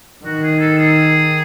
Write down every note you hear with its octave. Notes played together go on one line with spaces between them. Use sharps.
D#3 F#4
G#4
A4
G#4